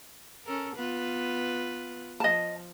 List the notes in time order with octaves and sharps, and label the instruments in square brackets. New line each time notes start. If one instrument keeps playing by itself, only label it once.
[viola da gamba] C#4 A4 A#4
B3 F4 B4
[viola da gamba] F3 [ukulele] D#5 A5